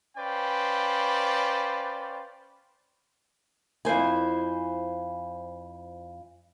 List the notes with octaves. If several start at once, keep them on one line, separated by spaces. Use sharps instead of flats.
C#4 B4 C5 D5 F5 G5
F2 E4 C5 G#5